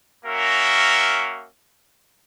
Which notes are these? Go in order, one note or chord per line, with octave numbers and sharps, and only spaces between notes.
A#3 C#4 F#4 A#4 E5